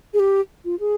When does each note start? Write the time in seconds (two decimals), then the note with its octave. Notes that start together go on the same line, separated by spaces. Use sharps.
0.14 G#4
0.20 G4
0.65 F4
0.80 G#4